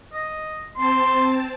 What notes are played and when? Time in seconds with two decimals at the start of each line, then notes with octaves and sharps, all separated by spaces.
0.13 D#5
0.76 C4 A5 C6